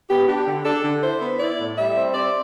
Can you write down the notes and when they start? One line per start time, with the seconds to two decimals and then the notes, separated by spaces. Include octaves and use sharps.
0.09 B3 G4
0.28 D4 G4
0.46 D3
0.65 D4 A4
0.84 D3
1.02 E4 C5
1.20 B3
1.40 E4 D5
1.59 A2
1.77 G3 E5
1.96 C4
2.14 C4 D5